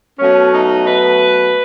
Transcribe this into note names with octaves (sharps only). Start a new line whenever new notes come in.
B2 F#3 A3 C#4
D#4
B4